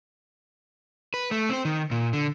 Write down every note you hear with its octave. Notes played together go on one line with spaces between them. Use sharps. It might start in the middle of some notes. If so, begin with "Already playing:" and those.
B4
A3
C4 C5
D#3
A#2
D3